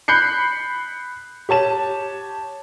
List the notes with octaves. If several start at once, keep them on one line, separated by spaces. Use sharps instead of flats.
B5 F#6 G6 C7 C#7
G4 C#5 A5 E7